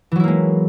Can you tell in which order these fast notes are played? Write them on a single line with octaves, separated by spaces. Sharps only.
E3 F#3 E4 A#3 G#3